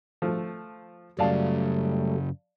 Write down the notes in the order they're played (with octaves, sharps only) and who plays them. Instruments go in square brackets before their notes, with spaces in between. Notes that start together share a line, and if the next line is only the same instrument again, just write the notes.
[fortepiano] F3 A3
[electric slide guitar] F#2 C#3 [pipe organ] F#3 G3 A3 [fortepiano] D5 F5 A5